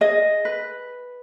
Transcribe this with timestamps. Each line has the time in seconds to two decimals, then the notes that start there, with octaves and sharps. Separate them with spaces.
0.01 G#4 D#5
0.45 B4